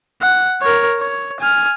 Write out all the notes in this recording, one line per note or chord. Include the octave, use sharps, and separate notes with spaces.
F#5
A#4 C#5
C#5
G#5 F6